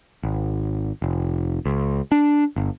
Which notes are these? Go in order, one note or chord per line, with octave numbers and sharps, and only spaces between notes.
G#1
F1
C#2
D4
G1